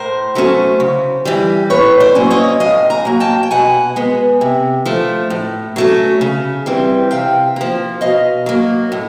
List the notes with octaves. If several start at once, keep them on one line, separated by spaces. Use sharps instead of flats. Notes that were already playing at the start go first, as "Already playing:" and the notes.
Already playing: A2 A#4 C5
F#3 A3 C#4
C#3
E3 G3
A2 B4 C#5
C5 D5
F#3 A#3 C#4
C#5 D#5
A2 D#5 F5
G#5 A#5
F#3 A#3
G5 A5
G5
B2 F#5 G#5
G#3 B3
C3
F3 A3
A2
F#3 A3 C#4
C#3
E3 G3 C4
C3 F5 G5
F3 A#3
B2 D#5 F5
F#3 A#3
A2